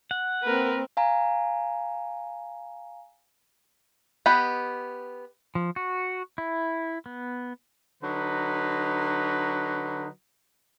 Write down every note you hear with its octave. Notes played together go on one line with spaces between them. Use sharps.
F#5
A#3 C4 A#4 B4
F5 G#5 A#5
B3 G4 B4 D#5 B5
F3
F#4
E4
B3
D3 F#3 D#4 B4